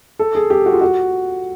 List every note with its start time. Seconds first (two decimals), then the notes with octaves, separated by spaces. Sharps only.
0.19 A4
0.35 G#4
0.50 G4
0.66 F#4
0.73 F4
0.81 F#4